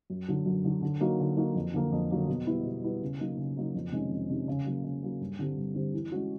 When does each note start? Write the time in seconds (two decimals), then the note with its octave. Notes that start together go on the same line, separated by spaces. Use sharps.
0.10 F#2
0.28 D3 F#3
0.46 F#2
0.64 D3 F#3
0.82 D3
1.01 F#3 A#3 D#4 F#4
1.20 D3
1.37 F#3 A#3 D#4 F#4
1.55 F2
1.74 D3 F#3 A#3
1.92 F2
2.11 D3 F#3 A#3
2.28 B2
2.47 G3 B3 E4
2.65 B2
2.83 G3 B3 E4
3.02 C#3
3.19 F#3 A#3 D#4
3.37 C#3
3.56 F#3 A#3 D#4
3.75 F2
3.92 C3 D#3 G#3 C#4
4.11 F2
4.29 C3 D#3 G#3 C#4
4.48 C#3
4.66 F#3 A#3
4.84 C#3
5.03 F#3 A#3
5.21 G2
5.39 D3 G3 C4
5.57 G2
5.75 D3 G3 C4
5.94 E3
6.12 G#3 C#4 F#4